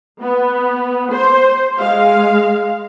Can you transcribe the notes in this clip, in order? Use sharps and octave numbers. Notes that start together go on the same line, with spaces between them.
B3
C5
G#3 F5